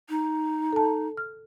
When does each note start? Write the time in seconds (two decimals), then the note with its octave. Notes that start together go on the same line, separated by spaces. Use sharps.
0.09 D#4
0.73 A4 A5
1.17 F6